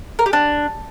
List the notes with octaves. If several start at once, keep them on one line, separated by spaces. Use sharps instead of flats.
A#4
G4
D4